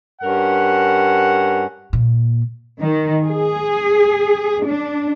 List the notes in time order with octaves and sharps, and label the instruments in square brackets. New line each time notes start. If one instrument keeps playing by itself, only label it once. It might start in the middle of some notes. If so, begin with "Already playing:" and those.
[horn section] G2 C#4 A#4 F#5
[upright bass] A#2
[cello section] D#3
G#4
D4